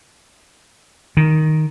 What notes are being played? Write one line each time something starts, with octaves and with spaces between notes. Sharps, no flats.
D#3